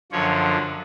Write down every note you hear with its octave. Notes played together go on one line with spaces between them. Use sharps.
F#2 D3 F3 C#5